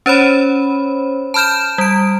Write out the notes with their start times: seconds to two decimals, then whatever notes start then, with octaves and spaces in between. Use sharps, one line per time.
0.06 C#4 C5 C#5 B5
1.34 A5 B5 F6 G6 E7
1.78 G3 D7